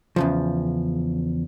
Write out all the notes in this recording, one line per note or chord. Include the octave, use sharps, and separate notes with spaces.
E2 C#3 F3